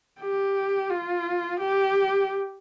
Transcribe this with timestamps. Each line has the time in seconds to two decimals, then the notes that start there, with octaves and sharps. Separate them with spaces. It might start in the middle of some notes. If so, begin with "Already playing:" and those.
0.20 G4
0.90 F4
1.60 G4